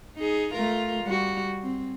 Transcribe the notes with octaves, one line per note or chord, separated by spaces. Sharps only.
D#4 G#4
A3 F4 A#4
G3 F#4
C4